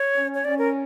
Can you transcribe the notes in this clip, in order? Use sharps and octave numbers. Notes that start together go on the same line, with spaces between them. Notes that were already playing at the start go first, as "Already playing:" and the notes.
Already playing: C#5
C#4
C#5
C#4 D5
A#4